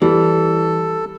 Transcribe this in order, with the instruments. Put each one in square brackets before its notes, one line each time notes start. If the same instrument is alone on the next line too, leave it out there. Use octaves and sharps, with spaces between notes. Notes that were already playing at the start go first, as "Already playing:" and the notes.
[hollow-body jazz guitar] E3 [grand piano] G3 [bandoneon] A4